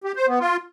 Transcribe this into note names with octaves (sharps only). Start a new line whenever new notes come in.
G4
C5
B3
F4